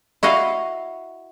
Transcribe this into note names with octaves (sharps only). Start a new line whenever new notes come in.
E4 F#4 D#5 F5